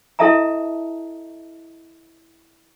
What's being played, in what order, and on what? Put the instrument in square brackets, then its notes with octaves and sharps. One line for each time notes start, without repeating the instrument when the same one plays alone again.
[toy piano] E4 A4 D#5 E5 A5 A#5